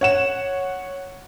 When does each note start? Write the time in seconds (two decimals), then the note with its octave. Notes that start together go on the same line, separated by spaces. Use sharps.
0.01 C#5 F#5 E7